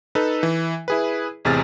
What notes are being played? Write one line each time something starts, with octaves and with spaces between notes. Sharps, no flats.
D#4 A4 B4
E3
E4 G#4 B4
A1 E2 C3 G#4 F6 A6